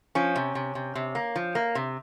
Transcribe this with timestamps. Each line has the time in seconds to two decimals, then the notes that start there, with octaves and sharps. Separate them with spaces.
0.15 F3 C#4
0.36 C3
0.55 C3
0.75 C3
0.95 C3
1.15 A#3
1.36 F3
1.55 A#3
1.75 C3